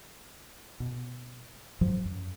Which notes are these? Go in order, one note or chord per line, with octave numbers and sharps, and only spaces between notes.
B2
G#2 F3 F#3
F#2